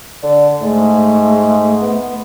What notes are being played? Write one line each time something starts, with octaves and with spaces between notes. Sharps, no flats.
D3 D5
G#2 A3
B3